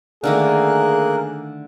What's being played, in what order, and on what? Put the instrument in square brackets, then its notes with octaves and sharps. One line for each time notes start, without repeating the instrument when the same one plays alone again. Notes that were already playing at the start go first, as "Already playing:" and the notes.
[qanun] D3 D#3 A3 [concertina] A#3 A#4 F#6 [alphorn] G#4